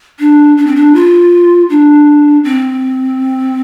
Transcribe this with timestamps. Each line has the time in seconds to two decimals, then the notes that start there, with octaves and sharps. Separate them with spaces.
0.19 D4
0.57 D4
0.67 C4
0.76 D4
0.95 F4
1.70 D4
2.44 C4